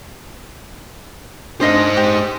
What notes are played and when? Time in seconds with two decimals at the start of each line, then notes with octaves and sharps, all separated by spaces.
1.61 D4 D#4 C5 D#5 F5
1.97 G4